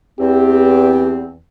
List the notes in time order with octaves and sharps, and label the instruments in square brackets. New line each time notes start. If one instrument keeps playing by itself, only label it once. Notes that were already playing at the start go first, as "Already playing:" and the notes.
[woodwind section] E2 C4 [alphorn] G4